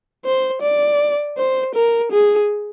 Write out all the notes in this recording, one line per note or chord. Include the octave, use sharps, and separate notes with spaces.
C5
D5
C5
A#4
G#4